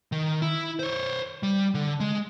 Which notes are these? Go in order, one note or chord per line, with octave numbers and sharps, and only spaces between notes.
D#3
E4
C5 C#5
G3
D3
G#3